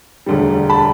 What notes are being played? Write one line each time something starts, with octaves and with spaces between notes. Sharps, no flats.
E1 D2 D3 G3
A5 B5